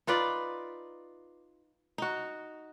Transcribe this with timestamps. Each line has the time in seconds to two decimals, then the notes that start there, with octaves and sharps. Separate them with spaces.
0.07 D#4 F4 B4 D5
1.98 D#4 F#4